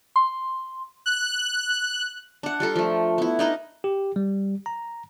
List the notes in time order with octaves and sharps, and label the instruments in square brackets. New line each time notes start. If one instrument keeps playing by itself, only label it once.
[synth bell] C6
[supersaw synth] F#6
[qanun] D4 F#5
G3 F4 A4 A#4
F3 A3
B3 E4
D4 D#4 A#4 B4
[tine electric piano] G4
G3
A#5